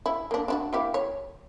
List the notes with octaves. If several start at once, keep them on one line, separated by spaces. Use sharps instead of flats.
E4
A#3 D4
D4 E4 F#4
A#3 E4 G4
C#5